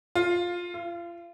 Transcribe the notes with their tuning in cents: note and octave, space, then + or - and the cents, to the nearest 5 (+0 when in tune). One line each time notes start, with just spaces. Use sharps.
F4 +10
F4 -30